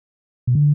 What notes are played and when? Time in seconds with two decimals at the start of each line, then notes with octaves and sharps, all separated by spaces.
0.47 B2
0.55 D3